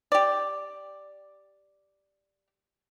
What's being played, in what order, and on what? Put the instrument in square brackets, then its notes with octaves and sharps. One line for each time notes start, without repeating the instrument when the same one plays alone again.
[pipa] G4 D5